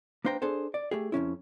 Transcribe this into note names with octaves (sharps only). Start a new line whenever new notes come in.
A#3 D4 B4 C5 G5 A#5
D4 G#4 A4 C5
D5
A3 G4 G#4
F2 F#3 C#4 E4